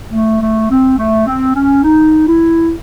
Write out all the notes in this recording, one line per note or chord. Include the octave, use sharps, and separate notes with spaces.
A3
A3
C4
A3
C4
C#4
D#4
E4